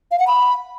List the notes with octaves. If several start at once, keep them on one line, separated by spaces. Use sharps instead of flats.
F5
F#5
B5